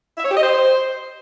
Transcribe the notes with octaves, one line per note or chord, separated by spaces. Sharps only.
E5
C#5
G4
D#5
C5